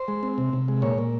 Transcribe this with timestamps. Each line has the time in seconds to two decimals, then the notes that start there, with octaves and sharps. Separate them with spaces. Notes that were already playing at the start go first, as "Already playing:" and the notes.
Already playing: C5
0.08 G#3
0.23 C4
0.38 C3
0.53 C3
0.68 G#3
0.82 A#2 C#5
0.98 A#2